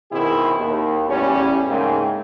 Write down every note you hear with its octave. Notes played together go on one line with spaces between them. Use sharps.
B2 D#3 C4 E4 G#4
D#2
A1 E2 G3 C#4
G#2 C#3 A3 A#3 C4